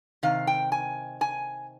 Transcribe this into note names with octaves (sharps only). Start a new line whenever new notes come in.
C3 D#3 F5
G5
G#5
G#5